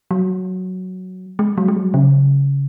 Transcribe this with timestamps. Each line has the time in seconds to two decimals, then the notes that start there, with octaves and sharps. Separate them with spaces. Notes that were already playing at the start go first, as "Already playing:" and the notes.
0.11 F#3
1.39 G#3
1.58 F#3
1.68 G#3
1.76 F#3
1.94 C#3